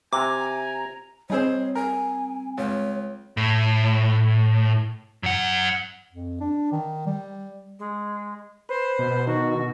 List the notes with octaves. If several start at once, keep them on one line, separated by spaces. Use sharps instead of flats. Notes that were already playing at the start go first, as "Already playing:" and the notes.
C3 G#5 A#5 D6
G3 C4 D#4 G#4 C5 C#5
A#4 G#5
C#2 C#5
A2
F#2 F#5
F2
D4
D#3
G3
G#3
B4 C5
B2
D#3 D#4 F#4